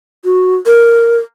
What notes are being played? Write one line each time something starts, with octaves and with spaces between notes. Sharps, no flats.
F#4
A#4